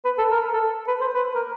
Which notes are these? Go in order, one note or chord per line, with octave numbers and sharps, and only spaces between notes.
B4
A4
A#4
A4
B4
C5
B4
A#4